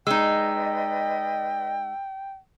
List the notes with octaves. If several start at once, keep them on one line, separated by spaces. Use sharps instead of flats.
G#3 D#4 B4 D5 D#5 G5 E6